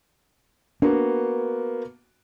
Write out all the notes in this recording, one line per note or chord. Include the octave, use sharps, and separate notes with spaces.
A#3 B3 D4 F#4